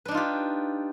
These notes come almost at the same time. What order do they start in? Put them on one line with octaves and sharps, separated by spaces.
B4 D4 D#4 F4 G4